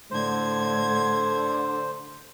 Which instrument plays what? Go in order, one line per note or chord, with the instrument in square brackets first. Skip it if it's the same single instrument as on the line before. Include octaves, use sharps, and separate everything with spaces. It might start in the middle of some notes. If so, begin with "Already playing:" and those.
[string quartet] A2 G#6 [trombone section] D3 [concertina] C5